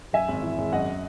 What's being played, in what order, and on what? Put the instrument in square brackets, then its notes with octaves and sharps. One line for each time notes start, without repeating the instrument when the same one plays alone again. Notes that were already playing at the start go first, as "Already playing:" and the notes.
[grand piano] F#2 [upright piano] E5 G#5
[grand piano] G#1
E3
G#1
[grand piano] F#2 [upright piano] D#5 F#5